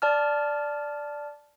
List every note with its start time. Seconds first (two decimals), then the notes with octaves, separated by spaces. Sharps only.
0.02 D5 A5 F6